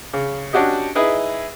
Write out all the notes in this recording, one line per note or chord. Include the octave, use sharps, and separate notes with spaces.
C#3
C#4 D4 F#4 G4 D#5
D#4 E4 G#4 B4 D#5